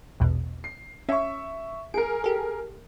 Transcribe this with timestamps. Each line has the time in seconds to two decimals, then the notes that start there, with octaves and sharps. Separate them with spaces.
0.20 A#1 E2 B2
0.64 C7
1.09 C#4 E5 C#6
1.94 G#4 A#4 D7
2.24 G4 A4